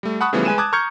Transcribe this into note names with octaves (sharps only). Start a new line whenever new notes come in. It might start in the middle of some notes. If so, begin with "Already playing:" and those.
G3 A3
F#5 A5 B5 C#6 D#6 F#6
C#3 E3 F3 G3 A3 B3
G#3 B4 G#5 F#6 D#7 E7
A5 D6 D#6 F#6 G#6
A#5 C#6 F6 G6 G#6 C#7